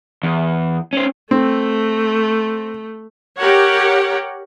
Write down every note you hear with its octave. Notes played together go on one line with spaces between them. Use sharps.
E2
C#4 C5
A3 C4
G4 A#4 C#5 F#5